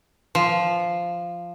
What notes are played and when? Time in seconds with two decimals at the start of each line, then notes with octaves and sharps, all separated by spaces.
0.35 F3